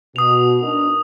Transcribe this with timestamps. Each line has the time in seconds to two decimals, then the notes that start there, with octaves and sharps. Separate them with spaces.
0.16 B2 D#6 F7
0.62 D4 D#4 A#4